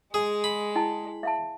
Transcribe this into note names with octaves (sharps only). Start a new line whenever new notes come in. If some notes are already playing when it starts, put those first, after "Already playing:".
G#3 G#4
B5
E4 G5 A5
E5 F5 A5